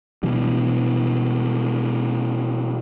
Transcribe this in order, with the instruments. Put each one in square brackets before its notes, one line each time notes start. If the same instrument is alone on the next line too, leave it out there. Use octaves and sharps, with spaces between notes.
[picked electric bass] B2 E3 G3